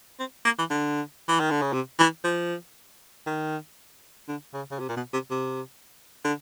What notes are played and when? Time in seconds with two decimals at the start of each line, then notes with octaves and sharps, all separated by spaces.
0.19 C4
0.45 A#3
0.58 E3
0.70 D3
1.28 E3
1.40 D#3
1.51 D3
1.62 C#3
1.73 C3
1.99 E3
2.24 F3
3.26 D#3
4.28 D3
4.53 C#3
4.71 C#3
4.79 C3
4.89 A#2
4.97 B2
5.13 C3
5.31 C3
6.24 D3